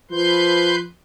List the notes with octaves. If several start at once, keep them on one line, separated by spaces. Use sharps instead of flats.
F3 B4 C6 G6